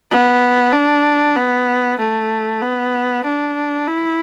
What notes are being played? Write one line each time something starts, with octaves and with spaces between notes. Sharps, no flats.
B3
D4
B3
A3
B3
D4
E4